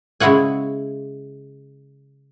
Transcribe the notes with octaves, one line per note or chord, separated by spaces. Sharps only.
C#3 G#3 E4 C#5 F#5 G#5